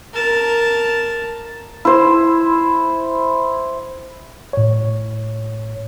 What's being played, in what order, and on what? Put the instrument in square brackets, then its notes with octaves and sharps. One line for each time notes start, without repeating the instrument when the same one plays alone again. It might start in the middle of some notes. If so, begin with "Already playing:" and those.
[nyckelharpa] A#4 A5
[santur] E4 C5
[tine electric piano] A2 C#5